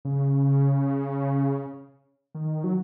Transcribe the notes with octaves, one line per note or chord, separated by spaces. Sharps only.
C#3
D#3
F#3